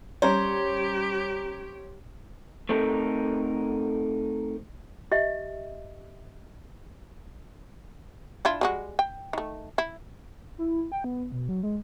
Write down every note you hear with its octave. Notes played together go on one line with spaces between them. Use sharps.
G3 C#4 G4 C5 C#5 A#5
A3 C4 D#4 A4 A#4
G4 D#5 E5
D4 E4 F4
G3 G#3 F#4
G5
D#3 A3
E4
E4
G5
B3
B2
F#3
G#3